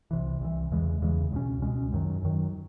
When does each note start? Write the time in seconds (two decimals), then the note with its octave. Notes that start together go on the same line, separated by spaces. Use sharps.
0.11 C2 C3 E3
0.41 C2 C3 E3
0.71 E2 C#3 E3 G#3
1.02 E2 C#3 E3 G#3
1.32 C#2 B2 G#3 C#4
1.62 C#2 B2 G#3 C#4
1.92 F#2 D#3 F#3
2.22 F#2 D#3 F#3